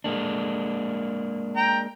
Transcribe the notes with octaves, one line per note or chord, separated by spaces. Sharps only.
G#3 A#3 D4
G5 A#5